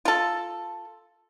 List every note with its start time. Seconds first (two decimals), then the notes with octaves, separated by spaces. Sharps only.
0.05 F4 A4